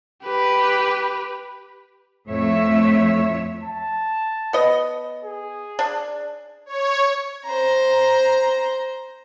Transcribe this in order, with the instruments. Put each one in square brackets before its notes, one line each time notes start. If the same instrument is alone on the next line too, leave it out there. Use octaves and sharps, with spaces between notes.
[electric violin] G4 B4
[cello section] F2 A2 F3 A3 C#5 E5
[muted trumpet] A5
[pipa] B3 D#5
[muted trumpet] G#4
[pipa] D4
[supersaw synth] C#5
[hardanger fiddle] C5 A#5